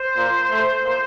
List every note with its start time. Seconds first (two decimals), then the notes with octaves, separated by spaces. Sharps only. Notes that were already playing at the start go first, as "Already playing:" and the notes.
Already playing: C5
0.18 A#2
0.51 A3
0.84 A#2